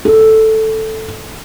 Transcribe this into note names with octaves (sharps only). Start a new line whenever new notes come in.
A4